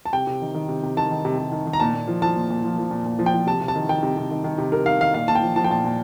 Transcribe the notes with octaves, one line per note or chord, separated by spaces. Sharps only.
A5
C3 G5
C3
D#3
D#3
C3
C3
D#3 A5
D#3
C3
C3
D#3
D#3
A#5
A#2 A5
A#2
F3
F3 A5
A#2
A#2
F3
F3
A#2
A#2
F3
G5
F3
C3 A5
C3
A5
D#3
D#3 G5
C3
C3
D#3
D#3
C3
C3 A#4
D#3 F5
D#3 F5
A#2 F5
A#2 A5
G5
F3
F3 A5
G5
A#2 A5
A#2